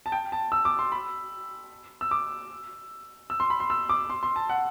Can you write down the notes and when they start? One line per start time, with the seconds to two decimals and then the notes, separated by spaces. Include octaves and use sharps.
0.06 A5
0.12 G5
0.32 A5
0.52 E6
0.65 D6
0.79 C6
0.92 B5
2.01 E6
2.11 D6
3.30 E6
3.40 C6
3.50 B5
3.60 C6
3.70 E6
3.89 D6
4.10 C6
4.23 C6
4.36 A5
4.49 F#5